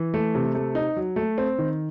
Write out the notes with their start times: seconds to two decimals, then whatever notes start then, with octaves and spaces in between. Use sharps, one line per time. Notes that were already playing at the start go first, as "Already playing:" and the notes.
Already playing: E3
0.14 A3
0.35 C3
0.55 A3
0.75 D#4
0.96 F#3
1.16 A3
1.38 C4
1.58 D#3